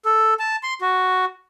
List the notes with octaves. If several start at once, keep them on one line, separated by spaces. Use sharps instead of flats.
A4
A5
C6
F#4